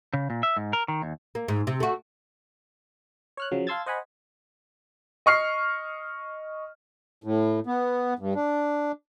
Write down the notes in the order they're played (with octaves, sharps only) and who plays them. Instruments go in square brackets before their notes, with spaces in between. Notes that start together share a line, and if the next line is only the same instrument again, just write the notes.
[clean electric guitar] C#3
A#2
E5
G#2
A#4
D#3
D#2
[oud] A#3
G#2
C3
A3 F#4
[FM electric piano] C#5 F6 F#6
C#3 F3 F#3
F5 A5 C6 E6 G#6 A6
C5 D#5 F#5 G#5 B5
[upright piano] D#5 C#6 F6 C7
[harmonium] A2
B3
G2
D4